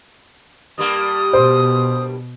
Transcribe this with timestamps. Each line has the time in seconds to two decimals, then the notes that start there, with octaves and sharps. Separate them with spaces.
0.78 G2 G3 A#3 D#6
1.33 B2 C5